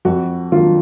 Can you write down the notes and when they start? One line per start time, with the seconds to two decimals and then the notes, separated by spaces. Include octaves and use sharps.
0.05 F2 F#4
0.52 D#3 F#3 D4 F4